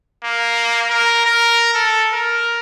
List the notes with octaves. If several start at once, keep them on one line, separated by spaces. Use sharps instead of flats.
A#3
A#4
A#4
A4
A#4